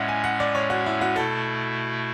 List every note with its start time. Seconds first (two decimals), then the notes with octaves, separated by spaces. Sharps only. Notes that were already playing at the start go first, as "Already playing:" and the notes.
Already playing: A2 G#3 C#4 D5 E5 F#5
0.09 G#5
0.24 F#5
0.40 D5
0.55 C#5
0.70 F#4
0.86 E4
1.01 F#4
1.16 B2 A3 E4 A4